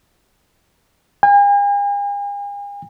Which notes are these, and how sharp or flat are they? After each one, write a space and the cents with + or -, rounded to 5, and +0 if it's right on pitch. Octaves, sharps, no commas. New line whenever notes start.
G#5 -45